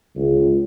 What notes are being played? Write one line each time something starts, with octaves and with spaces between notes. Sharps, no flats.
C#2